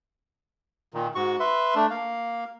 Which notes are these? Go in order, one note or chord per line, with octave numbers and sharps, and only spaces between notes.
A#2 D#3
G#2 F#4 C#6
B4 E5 C6
A3 D4
A#3 F5